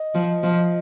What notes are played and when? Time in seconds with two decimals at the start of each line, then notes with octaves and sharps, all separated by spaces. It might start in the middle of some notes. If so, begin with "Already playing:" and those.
Already playing: D#5
0.15 F3
0.43 F3